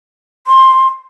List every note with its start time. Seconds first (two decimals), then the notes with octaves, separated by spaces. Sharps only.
0.47 C6